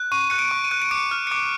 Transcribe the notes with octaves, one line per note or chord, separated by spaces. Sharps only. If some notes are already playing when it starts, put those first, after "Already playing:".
Already playing: F#6
C#6 D#7
F#6 C#7
D7
C#6
D#7
F#6
D7
D6 C#7
F6
C#7
D6 D7